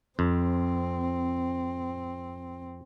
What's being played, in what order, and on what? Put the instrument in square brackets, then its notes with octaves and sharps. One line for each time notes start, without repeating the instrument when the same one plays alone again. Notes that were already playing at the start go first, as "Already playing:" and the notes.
[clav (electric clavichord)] F2 [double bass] C4